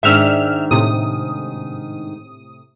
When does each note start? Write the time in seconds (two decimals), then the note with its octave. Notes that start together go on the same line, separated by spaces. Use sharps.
0.03 G#2 D#3 D4 E5 E6 F6
0.71 A2 C3 D#6